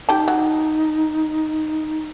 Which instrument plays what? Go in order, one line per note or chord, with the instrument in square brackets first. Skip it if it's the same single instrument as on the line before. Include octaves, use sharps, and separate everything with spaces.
[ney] D#4 [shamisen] G4 G5 A5
[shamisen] F#3